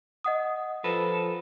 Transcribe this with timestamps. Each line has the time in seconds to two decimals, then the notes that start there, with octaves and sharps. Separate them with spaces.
0.24 D#5 F#5 D#6
0.84 F3 A4 B4